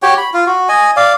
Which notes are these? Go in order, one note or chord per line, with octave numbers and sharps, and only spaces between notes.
F#4 G4 C#5 G5
B5
F4
F#4
D#5 G#5
D5 F5